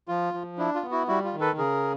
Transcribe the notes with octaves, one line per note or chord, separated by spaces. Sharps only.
F3 F4
F3
D4 E4
F4
B3
E4 F#4
G3 E4 F#4
F4
D#3
A4 B4
C#3 G#4 A#4